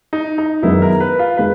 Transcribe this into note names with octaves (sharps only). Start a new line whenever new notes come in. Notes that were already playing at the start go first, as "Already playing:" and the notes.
D#4
D#4
F#2 D#3 G#3 B3 D#4 E4
A#4
B4
F4
D#3 G#3 B4